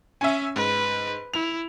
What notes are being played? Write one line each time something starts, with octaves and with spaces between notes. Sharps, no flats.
C#4 E5 G#5
G#2 B4
E4 F7